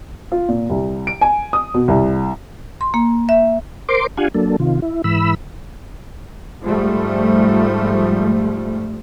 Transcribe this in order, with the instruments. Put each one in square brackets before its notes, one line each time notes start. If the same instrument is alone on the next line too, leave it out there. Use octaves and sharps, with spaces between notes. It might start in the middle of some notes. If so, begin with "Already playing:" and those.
[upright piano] F4
A#2
C2
D7
G#5
D#6
B2
C2
[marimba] C6
A#3
E5
[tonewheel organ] A#4 C5 C6 D6
D4 F4 G4 F5 F#5 G#5
F#3 A#3 D4 A4
C3 D#3 F4
E4
G#2 E3 B5 E6
[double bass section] G#2 F3 G3 A3